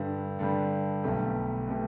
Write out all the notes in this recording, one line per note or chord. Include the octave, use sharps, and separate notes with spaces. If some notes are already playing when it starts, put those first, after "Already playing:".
Already playing: G2 D3 G3
G2 D3 G3
B1 B2 A3 G4
B2 A3 G4